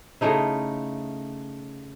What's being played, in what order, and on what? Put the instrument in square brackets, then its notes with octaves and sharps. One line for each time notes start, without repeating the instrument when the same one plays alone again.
[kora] C#3 A3 D#4 E4